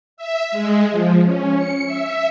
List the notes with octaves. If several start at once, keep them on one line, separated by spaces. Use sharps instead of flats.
E5
G#3
F3
C#4
C#7
E5